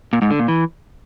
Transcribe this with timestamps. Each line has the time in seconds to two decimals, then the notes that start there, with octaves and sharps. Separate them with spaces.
0.13 A#2
0.22 G#2
0.31 D3
0.39 A#2
0.48 E3